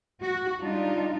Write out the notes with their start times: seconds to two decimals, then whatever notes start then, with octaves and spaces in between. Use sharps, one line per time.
0.22 F#4
0.63 G3 D4 D#4 F4